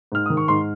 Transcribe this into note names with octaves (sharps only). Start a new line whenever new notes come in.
G#2 F6
D#3 D#6
C#6
G#2 C6